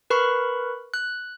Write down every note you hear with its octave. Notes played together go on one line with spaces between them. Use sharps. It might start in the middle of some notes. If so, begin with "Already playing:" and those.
A#4 B4 B5 C#6
F#6